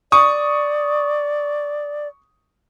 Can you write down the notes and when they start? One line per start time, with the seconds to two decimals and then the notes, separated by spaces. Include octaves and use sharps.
0.12 D5 C#6 D#6